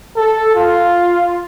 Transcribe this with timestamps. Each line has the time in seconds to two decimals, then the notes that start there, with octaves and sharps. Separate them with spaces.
0.16 A4
0.55 F4